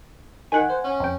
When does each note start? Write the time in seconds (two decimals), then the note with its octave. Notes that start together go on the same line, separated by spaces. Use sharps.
0.52 D#3 F#5 G#5
0.69 C5
0.84 C#4
1.00 F2 G5